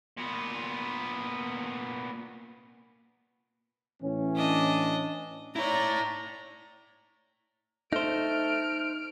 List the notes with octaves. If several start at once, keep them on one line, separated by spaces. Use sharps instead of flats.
A#2 B3
A2 E3 C#4
D4 D#5
E4 C#5 D5 A#5
A3 D#4 C5 F6 D7